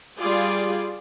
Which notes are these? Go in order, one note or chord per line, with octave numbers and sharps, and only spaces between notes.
G3 F4 G#4 D5